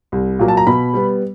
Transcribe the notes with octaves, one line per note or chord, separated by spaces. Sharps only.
C2
A#2 F#3 A#3
A5
A#5
B2 B5
G3 B3